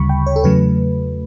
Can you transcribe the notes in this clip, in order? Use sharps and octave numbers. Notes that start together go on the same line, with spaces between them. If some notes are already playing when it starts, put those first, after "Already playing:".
Already playing: D2 C#3 G3 B5 C#6
G5
C#5
A4
E2 C#3 F#3 A3 B4